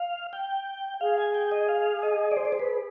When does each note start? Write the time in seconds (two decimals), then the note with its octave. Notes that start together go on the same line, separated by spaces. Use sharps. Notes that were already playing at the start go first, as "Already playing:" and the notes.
Already playing: F5
0.33 G5
1.00 G#4 F5
1.18 G#5
1.34 G5
1.52 D#5
1.69 F5
2.03 D#5
2.31 D5
2.37 C5
2.45 D5
2.52 C5
2.60 B4